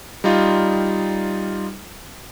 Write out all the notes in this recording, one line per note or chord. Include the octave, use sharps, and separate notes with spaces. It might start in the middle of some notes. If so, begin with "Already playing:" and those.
G3 D#4 F4